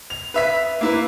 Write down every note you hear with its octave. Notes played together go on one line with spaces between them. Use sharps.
F7
B4 E5 B6
A#3 E4 B4